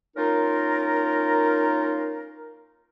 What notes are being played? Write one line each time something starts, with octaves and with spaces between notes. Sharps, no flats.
A#3 C#4 D#4 F4 A#4